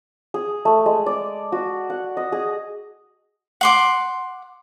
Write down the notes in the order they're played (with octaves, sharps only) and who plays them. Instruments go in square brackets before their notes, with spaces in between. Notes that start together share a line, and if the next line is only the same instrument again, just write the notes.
[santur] G#4
A3
G#3
D5
F#4
F#5
D#5
G#4
[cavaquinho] F#5 C6 D6